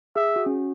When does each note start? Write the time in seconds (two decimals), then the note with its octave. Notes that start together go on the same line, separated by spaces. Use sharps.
0.16 G#4 E5
0.36 F#4
0.46 C#4